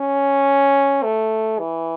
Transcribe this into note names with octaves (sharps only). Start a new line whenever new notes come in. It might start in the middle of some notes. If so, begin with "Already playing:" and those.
Already playing: C#4
A3
E3